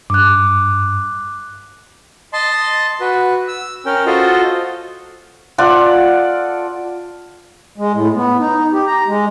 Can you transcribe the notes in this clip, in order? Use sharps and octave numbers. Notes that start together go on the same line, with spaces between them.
G2 D6 F#6
D#5 A5 C6
F#4 B4
E6
C#4 A#4 G5
F4 F#4 A4 C5 D#5
F4 A4 D5 F#5
G#3
A2
B3
D#4
G4
A#5
G#3